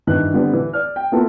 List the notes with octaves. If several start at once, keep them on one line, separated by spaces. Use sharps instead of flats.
G2 D#3 E3 F#6
D3 G3 B3 C4
E3
D5 F6
G5
A#3 B3 E4 F4 A4